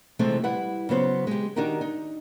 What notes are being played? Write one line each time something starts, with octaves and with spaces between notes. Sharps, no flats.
C3 E3 F3 G#3 A3 C4
G3 E4 B4 F#5
C#3 F#3 B3 C5
G#3 G4
D#3 D4 D#4 F#4 G4 A#4
D#4